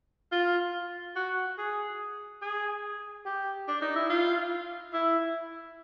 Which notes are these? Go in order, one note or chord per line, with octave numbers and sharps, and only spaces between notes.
F4
F#4
G#4
G#4
G4
D4
D#4
E4
F4
E4